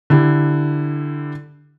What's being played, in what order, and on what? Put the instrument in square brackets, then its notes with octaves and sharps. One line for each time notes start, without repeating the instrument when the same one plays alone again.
[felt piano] D3 E4 G4